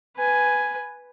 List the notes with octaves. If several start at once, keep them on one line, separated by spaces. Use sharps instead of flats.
B4 G#5